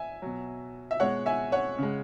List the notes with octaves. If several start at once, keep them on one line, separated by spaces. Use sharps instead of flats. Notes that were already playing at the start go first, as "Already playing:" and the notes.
Already playing: E5 G#5
B2 F#3
E5
B2 G#3 C#5 F#5
E5 G#5
C#5 F#5
C#3 G#3